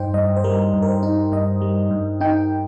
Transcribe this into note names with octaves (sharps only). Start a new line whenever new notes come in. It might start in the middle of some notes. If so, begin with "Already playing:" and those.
Already playing: G2 D#4 C5 G5
G2 D#5
C5
G3 A#4
G2
A#4
C5
D#4
G2 D#5
G3
G2
D#4 G5